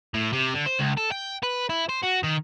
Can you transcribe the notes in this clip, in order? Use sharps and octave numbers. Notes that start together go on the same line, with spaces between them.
A2
C3
D3
C5
C#2
A4
G5
B4
E4
C5
F#4
D#3